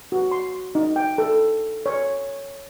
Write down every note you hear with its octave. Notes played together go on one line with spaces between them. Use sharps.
F#4
C6
D#4
G5
A4
C#5